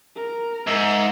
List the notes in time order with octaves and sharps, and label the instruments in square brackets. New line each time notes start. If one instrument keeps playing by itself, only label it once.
[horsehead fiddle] A#4
[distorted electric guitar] G#2 [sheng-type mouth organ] E5 A#5 E6